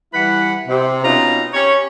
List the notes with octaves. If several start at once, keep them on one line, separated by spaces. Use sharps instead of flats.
E3 G3 E4 B4 F#5 B5
C3
B2 C4 C#4 D#4 F4 A#5
C#4 G4 C#5